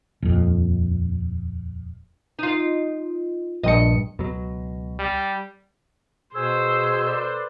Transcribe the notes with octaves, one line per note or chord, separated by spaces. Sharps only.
D#1 F2
D#4 F4
A#1 G2 D#5 C#7
C#2 B2 F#3
G3
B2 G#4 C5 E6
A4 B4 D5